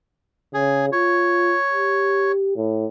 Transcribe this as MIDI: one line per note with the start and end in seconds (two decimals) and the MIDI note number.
0.54 0.89 49
0.54 0.86 68
0.92 1.56 65
0.92 2.32 73
1.73 2.54 67
2.56 2.86 45